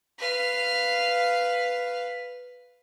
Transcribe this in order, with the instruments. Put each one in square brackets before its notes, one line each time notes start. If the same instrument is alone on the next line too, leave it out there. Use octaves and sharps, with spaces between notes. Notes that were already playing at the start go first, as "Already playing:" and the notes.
[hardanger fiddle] B4 F5